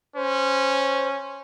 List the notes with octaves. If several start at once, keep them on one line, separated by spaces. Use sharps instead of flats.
C#4 C5